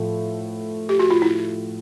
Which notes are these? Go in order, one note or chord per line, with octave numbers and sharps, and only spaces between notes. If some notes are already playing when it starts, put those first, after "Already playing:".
Already playing: A2 F3 A3
G4
F#4
F4
E4